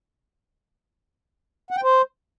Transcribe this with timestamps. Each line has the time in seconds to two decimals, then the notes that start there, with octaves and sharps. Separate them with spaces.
1.71 F#5
1.77 G5
1.83 C5